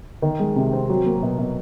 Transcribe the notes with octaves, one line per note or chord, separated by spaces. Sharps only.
D#3
G#3
C3
C4
F#3
A#3
B2
B2